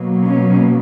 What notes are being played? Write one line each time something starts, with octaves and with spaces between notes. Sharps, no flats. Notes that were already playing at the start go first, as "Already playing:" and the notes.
Already playing: B2 F#3 A#3
C#4